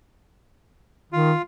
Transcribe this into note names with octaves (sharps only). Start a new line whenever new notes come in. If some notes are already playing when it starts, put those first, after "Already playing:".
D#3 F4